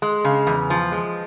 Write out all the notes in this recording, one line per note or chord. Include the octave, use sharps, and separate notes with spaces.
G#3
C#3
E2
F3
G#3